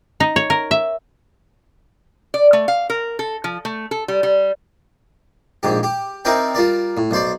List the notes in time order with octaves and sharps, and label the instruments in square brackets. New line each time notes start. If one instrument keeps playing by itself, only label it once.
[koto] D#4
C#5
A#4
E5
[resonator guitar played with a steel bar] D5
A3
F5
A#4
A4
F3
A3
A4
G3
G3
[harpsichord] A#1 G#2 G4
G4
C4 D#4 E4 A#4 D5 G5
G3 F4 A#4 D5
A2
B1 C5 D5